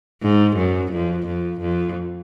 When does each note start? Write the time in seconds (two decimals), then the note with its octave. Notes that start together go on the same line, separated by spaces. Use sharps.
0.22 G#2
0.56 F#2
0.92 F2
1.27 F2
1.61 F2